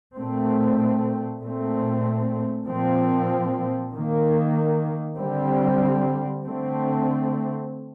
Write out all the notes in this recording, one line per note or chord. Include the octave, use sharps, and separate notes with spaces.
A#2 A3 C4
A#2 A3 C4
A#2 F3 C4
D#3 A#3
D3 G3 C4
D3 A3 C4